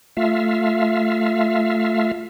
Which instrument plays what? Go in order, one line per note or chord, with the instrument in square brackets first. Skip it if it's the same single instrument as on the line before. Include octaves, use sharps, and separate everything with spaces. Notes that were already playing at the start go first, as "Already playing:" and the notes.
[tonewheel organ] A3 F4 E5 F5